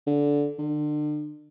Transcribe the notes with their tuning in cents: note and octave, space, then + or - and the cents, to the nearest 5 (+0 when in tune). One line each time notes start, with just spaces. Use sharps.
D3 -15
D3 +35